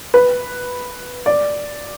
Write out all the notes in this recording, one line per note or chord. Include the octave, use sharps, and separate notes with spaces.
B4
D5